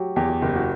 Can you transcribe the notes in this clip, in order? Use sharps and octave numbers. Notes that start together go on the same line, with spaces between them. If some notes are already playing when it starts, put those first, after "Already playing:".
Already playing: F#3 F#4 G4
E2 G4
G4
F#1 G4
F#4